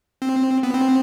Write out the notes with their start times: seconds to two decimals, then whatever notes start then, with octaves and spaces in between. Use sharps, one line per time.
0.22 C4
0.63 B3
0.74 C4